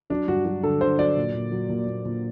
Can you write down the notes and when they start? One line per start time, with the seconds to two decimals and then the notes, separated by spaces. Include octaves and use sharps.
0.10 F#3 D4
0.28 G2 F#4
0.45 F#3 F#4
0.63 D3 A4
0.81 D3 C5
0.99 F#3 D5
1.17 A#2
1.34 A#2
1.52 F#3
1.69 A#2
1.87 A#2
2.05 A#2